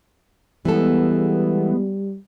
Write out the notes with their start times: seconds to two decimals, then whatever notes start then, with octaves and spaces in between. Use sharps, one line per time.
0.65 E3 G3 G#3 B3 A4